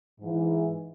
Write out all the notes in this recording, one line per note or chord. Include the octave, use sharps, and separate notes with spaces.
G#2 E3